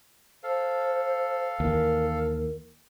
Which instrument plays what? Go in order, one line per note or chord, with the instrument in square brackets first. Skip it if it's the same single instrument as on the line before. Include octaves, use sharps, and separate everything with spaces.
[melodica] A4 F5 [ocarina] C5
[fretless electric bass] D#2 E3 [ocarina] A#4